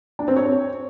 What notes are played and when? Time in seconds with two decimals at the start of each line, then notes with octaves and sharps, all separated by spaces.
0.19 D4
0.28 C4
0.36 C#5